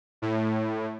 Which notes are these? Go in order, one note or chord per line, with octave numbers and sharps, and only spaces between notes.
A2